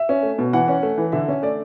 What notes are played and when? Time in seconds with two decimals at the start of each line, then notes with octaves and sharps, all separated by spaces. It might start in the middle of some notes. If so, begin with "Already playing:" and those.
Already playing: E5
0.09 C#4
0.23 A3
0.38 B2
0.53 E3 F#5
0.68 C#4
0.83 A3
0.98 E3
1.12 D3 E5
1.28 C#4
1.42 A3 D5